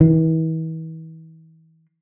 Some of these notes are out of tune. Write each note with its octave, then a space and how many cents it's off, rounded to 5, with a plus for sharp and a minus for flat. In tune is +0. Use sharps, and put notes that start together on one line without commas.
E3 -40